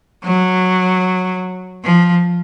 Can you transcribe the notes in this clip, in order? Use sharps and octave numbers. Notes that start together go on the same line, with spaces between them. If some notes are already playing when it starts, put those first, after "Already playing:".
F#3
F3